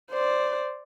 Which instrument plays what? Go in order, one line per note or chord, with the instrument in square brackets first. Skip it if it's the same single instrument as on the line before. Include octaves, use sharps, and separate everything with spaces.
[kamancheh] C5 D5